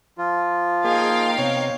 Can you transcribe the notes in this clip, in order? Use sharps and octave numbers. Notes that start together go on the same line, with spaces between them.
F3 F4
A#3 D#4 G#4 A#4 F5 G5
C3 B3 C#5